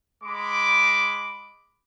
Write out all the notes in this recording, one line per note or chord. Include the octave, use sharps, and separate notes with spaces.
G#3 B5 D6